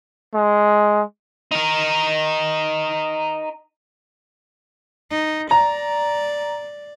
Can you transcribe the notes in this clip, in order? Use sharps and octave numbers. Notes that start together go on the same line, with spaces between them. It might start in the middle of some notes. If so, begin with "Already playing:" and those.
G#3
D#4 A#4
D#4
D5 A#5